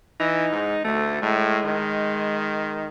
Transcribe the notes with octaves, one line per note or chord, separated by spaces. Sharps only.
E3 D#4
G#2
D2 A3
A2 G#3
D#3